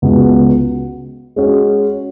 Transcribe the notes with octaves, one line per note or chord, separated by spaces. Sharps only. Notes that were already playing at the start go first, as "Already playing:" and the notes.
C#2 C#3 G#3 B3 F#4
G#3 C#4 F#4